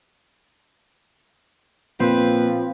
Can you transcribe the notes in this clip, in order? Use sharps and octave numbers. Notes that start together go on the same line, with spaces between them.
A#2 F3 C4 B4